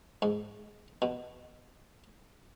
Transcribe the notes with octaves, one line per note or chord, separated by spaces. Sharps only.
G#2
B2